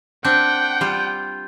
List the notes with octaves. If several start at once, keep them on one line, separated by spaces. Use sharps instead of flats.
C4 D4 F#5 G5 G6
G3 F4